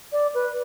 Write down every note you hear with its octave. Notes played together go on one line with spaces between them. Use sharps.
D5
B4